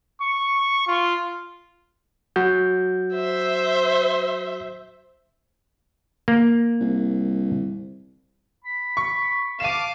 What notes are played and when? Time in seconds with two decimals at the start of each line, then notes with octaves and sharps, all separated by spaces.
0.22 C#6
0.87 F4
2.36 F#3 F#4 G6
3.14 C5 E5
6.28 A#3
6.81 C2
8.64 B5
8.97 C#6
9.60 F5 A5 D6 D#7 E7